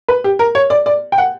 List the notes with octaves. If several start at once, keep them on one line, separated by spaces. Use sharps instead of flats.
B4
G4
A#4
C#5
D5
D5
G5
F#5